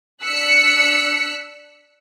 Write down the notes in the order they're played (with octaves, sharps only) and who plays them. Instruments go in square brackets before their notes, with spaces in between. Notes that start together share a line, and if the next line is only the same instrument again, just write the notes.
[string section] D4 E6 F#6 B6 C#7